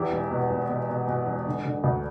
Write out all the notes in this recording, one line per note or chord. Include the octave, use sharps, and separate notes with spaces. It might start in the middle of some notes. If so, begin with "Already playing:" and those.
Already playing: E2 E4 G4
E1
B2
E1
B2
B2
B2
E1
D3
D3
D2